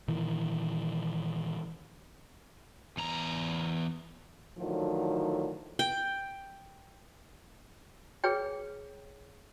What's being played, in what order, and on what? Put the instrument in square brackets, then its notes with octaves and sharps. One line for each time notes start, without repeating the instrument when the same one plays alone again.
[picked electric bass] A#2 D#3 E3
[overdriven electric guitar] E2 A#5
[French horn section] A2 D3 D#3 F3 F#3
[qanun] G5
[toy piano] G#4 B4 C#5 G5